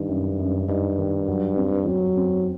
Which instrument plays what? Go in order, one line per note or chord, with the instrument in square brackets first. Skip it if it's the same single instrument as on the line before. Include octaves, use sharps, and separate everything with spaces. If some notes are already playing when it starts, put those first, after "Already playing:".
Already playing: [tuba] G2 [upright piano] D#3 D#4
[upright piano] F#2
F#2
[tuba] G2 [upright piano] D#4
[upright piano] D#3
F#3
C4
[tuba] F#3 [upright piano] C4
[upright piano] C4